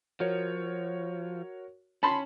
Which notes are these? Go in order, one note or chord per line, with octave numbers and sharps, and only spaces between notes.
F3 F#4 A#4 C#5
C#4 A5 B5 C6